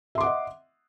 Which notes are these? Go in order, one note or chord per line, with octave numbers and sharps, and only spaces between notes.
D#5 E5 F#5 C6 D6